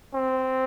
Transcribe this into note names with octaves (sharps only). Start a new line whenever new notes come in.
C4